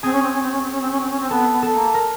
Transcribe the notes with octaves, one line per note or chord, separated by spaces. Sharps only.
C4 G#4
C#4
C4
C#4
C4
C#4
C4
C#4
C4
C#4
C4
C#4
C4
B3 A4
B3
A4
A#3
A#4